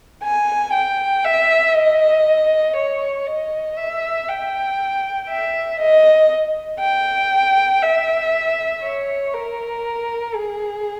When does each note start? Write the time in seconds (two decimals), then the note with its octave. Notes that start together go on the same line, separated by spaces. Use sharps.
0.23 G#5
0.73 G5
1.24 E5
1.75 D#5
2.76 C#5
3.26 D#5
3.76 E5
4.28 G5
5.29 E5
5.80 D#5
6.80 G5
7.82 E5
8.83 C#5
9.34 A#4
10.35 G#4